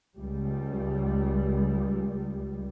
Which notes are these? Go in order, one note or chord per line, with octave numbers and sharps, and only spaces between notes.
C#2 G3